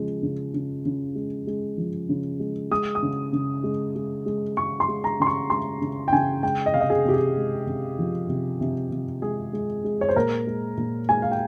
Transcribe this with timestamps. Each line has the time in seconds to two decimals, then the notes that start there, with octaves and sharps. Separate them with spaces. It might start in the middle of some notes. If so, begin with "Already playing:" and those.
Already playing: C#3 F3 G#3
0.23 C#3
0.54 C#3
0.85 C#3
1.15 G#3
1.47 G#3
1.78 F3
2.09 C#3
2.40 G#3
2.71 G#3 D#6
2.95 D#6
3.03 C#3
3.33 C#3
3.64 G#3
3.96 G#3
4.26 G#3
4.57 G#3 C#6
4.80 C6
4.88 G#3
5.04 A#5
5.20 C#3 C6
5.27 C#6
5.50 G#3 C6
5.81 C#3
6.08 G5
6.12 C#3 G#5
6.43 G#3 G5
6.66 D#5
6.74 C3 F5
6.81 D#5
6.90 G#4
7.05 C3 G4
7.14 G#4
7.37 G#3
7.67 C3
7.99 F3
8.29 C3
8.61 C3
8.92 C3
9.22 G#3 G#4
9.53 G#3
9.84 G#3
10.01 C#5
10.09 C5
10.16 A#2 A#4
10.47 G#3
10.77 A#2
11.09 G#3 G#5
11.22 F5
11.32 G5